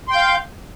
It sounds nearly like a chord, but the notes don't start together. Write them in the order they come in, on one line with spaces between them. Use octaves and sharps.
C6 G5 G6 F5